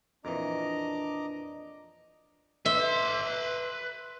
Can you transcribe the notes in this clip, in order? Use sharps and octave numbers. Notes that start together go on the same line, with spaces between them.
F2 A#2 E3 D4 D#5 A#5 D6
B4 E5 C6